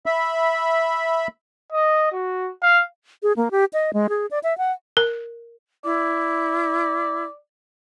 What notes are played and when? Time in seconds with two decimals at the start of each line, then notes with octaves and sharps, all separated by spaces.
0.06 E5 B5
1.73 D#5
2.12 F#4
2.62 F5
3.23 G#4
3.37 A#3
3.51 G4
3.73 D#5
3.93 G#3
4.09 G#4
4.31 D5
4.43 E5
4.58 F#5
4.97 A#4
5.85 E4 D5